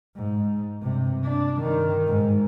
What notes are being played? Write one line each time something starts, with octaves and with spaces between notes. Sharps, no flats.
G#2
G2 C3
D4
G2 D#3
G#2